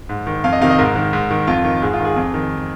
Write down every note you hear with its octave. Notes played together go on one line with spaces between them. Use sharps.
G#2
D#3
F2 F5
D#5
C3 D#3 F5
D#5
G#2 A#4
D#3
G#2
D#3
F2 F4
D#3
G#2 G#4
F4
D#3
G#4
F2
D#3